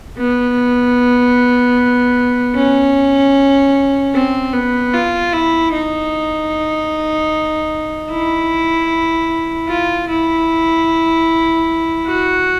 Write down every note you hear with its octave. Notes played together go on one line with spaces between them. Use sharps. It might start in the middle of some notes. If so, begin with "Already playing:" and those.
B3
C#4
C4
B3
F4
E4
D#4
E4
F4
E4
F#4